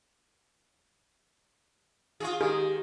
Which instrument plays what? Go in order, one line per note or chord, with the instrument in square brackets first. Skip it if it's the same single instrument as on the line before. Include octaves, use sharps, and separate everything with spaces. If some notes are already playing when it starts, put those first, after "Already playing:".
[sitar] F4 F#4 G#4
[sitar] D#3 [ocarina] G4 [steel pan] G#4
[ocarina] G4